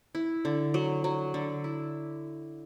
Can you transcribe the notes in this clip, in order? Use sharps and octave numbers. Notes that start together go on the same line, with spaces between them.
E4
D3
F#3
F#3
D3
E4